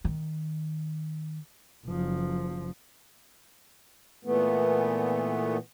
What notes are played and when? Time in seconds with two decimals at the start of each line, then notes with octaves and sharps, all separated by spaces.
0.05 D#3
1.86 F#1 F3
4.25 A#2 E3 A3 B3